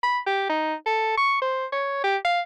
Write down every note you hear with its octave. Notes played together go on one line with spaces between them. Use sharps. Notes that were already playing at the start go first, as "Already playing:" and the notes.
B5
G4
D#4
A4
C#6
C5
C#5
G4
F5